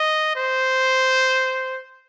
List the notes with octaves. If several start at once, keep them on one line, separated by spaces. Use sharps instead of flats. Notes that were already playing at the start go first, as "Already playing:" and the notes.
Already playing: D#5
C5